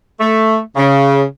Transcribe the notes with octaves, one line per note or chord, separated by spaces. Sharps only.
A3
C#3